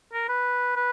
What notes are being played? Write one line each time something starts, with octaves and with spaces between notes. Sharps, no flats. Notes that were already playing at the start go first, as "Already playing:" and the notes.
A#4
B4
B4